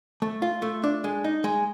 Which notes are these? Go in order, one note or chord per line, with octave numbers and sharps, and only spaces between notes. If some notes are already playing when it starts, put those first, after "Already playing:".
A3
F4
A3
D4
G#3
D#4
G#3